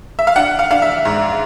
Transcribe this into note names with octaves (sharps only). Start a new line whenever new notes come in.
E5
F5
D4 F#5
F5
D4 F5
E5
G#2